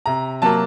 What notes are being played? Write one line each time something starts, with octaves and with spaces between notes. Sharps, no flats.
C3 A#5
F#3 A#3 A5